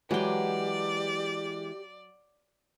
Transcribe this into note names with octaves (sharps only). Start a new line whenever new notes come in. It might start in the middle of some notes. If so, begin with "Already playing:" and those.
E3 F#3 G#3 G4 B4 D5 G5